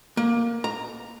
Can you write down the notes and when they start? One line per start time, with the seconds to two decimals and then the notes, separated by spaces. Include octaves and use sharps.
0.17 A#3
0.64 A#5